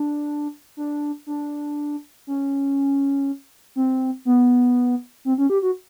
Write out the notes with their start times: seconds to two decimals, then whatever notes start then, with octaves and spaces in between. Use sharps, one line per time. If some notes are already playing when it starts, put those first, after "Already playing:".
Already playing: D4
0.77 D4
1.27 D4
2.27 C#4
3.76 C4
4.25 B3
5.25 C4
5.38 C#4
5.50 G4
5.62 F#4